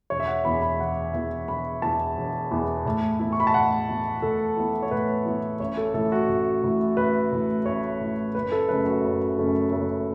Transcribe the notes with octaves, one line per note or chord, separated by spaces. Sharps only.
E1 C#5
E5
F#5
E2 E3 B3 B5
B5
E1 F#5
E2 E3 B3 E5
E1 B5
E2 E3 B3 A5
E1
E2 E3 B3
A2
E3 B3 E4
C#6
B5
A5
A2 F#5
E3 B3 E4
A2 A4
E3 B3 E4
C#5
A2 B4
E3 B3 E4
A1 C#5
A4
A2 E3 A4
F#4
A1
A2 E3
A1 B4
A2 E3
A1 C#5
A2 E3
F#1 B4
A4
F#2 C#3 A3 C#4 B4
F#4
F#1
F#2 C#3 A3 C#4
F#1 A4